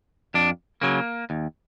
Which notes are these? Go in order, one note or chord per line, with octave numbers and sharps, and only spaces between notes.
F2 D4
C#3 F#3 A#3
D#2